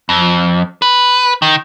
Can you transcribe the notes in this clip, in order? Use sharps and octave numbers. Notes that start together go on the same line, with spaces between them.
F2
B4
D#3